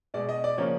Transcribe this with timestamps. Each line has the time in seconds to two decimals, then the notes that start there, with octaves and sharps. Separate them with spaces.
0.14 B2 G#3 D5
0.29 D#5
0.44 D5
0.58 C#3 F3 A#3 C#5